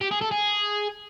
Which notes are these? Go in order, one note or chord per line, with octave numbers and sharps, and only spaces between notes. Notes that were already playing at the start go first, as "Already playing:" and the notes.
G4
G#4
A4
G#4